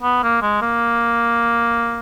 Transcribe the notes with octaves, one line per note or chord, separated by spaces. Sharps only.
B3
A#3
G#3
A#3